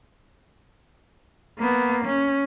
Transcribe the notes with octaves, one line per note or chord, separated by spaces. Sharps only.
A#3 B3
C#4